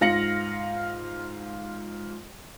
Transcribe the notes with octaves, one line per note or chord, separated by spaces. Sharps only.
G#2 F4 F5 A#6 C#7 F#7